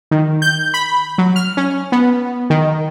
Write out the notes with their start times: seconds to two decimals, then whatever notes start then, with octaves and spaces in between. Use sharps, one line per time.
0.11 D#3
0.42 G6
0.74 B5
1.18 F#3
1.36 F6
1.57 C#4
1.92 B3
2.50 D#3